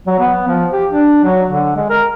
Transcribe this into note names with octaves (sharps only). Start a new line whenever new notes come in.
F#3
B3
F3
G4
D4
F#3
D3
G#3
A#4